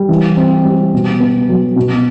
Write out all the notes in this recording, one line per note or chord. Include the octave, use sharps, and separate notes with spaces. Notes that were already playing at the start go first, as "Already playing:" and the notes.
Already playing: G3
E3
C4
G3
B2
B3
F#3
B2